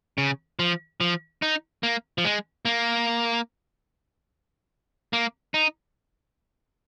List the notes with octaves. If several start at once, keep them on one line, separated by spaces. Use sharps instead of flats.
C#3
F3
F3
D#4
A#3
F3
G#3
A#3
A#3
D#4